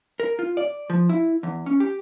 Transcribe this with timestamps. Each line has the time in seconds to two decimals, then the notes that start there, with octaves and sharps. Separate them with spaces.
0.20 A#4
0.39 F4
0.57 D5
0.90 F3
1.09 E4
1.43 E2
1.66 C#4
1.80 G4